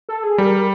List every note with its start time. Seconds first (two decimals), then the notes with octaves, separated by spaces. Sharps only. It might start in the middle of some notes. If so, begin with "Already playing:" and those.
0.09 A4
0.23 G#4
0.38 G3 A#4